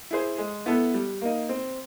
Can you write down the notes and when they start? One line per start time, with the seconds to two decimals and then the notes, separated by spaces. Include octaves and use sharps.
0.11 E4 G#4 C5
0.38 G#3
0.66 B3 E4 A4
0.94 G3
1.22 A#3 D#4
1.49 C4